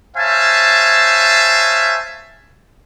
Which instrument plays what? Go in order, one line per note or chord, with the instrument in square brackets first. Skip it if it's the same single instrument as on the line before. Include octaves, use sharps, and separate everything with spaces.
[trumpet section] C5 C#5 E5 F5 G#5 A5